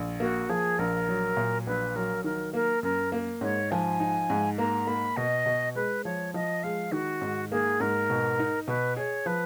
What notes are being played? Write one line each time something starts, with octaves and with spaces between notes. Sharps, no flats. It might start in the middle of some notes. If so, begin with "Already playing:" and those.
Already playing: A#1
A#3 F#4
F3 G#4
A#1 A#4
F#3
A#2
A#1 B4
F#3 A#4
D#3 A#4
A#3 A#4
F#2 A#4
A#3
G#2 C#5
F3 G#5
D#4
G#2
A#3 A#5
A#3 B5
B2 D#5
B2
G#3 B4
F3 C#5
F3 D#5
G#3 F5
D#3 F#4
G#2
A#3 G#4
G#2 A#4
B2
D#4
B2 B4
G#4 C#5
F3 B4